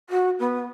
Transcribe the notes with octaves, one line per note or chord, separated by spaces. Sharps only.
F#4
B3